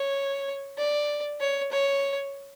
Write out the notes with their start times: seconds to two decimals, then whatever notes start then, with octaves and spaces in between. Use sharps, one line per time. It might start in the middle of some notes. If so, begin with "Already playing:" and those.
Already playing: C#5
0.78 D5
1.40 C#5
1.72 C#5